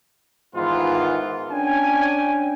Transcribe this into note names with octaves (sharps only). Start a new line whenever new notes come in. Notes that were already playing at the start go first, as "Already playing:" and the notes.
G#2 D#3 E3 B3 F4
C#4 D4 G5 G#5